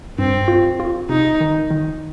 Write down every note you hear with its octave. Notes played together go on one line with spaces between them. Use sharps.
G2 C4
F4
F4
C3 D#4
D#3
D#3